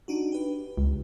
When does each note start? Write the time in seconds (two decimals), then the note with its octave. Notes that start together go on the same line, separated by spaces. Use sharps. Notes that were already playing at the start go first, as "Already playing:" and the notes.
0.08 D4 D#4 F#4
0.32 G4 B4
0.77 C#2